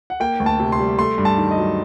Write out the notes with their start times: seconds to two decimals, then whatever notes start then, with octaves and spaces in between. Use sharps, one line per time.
0.10 F#5
0.20 A#3 G5
0.40 D2
0.46 A5
0.60 C3
0.72 C6
0.79 G3
0.99 A3 C6
1.18 G2
1.25 A5
1.38 D#3
1.51 D#5
1.58 F#3